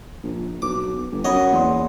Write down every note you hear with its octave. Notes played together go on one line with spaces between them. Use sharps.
A#1
B1 D6
G1
F#2 C#5 D#5 F#5 B5
E2 A#3 D5 C6